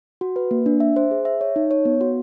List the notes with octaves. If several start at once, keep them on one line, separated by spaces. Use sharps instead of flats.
F#4
B4
A#3
D4
E5
C5
G#4
E5
C#5
D#4
C#5
B3
F#4